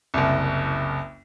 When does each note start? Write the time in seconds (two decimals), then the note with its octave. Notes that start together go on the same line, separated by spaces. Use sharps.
0.14 F#1 C2